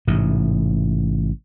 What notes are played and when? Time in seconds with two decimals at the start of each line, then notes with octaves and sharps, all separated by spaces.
0.07 A1 G#2 C3